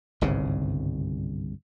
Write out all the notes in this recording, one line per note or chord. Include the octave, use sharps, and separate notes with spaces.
G1 C2 G#2 C#3